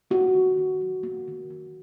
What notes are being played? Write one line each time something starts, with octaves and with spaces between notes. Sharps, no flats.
A#3 F#4
D#3
D#3
F#3
A#3
D#3
D#3